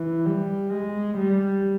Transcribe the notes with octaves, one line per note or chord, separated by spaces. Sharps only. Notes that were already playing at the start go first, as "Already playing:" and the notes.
Already playing: E3
G3
G#3
G3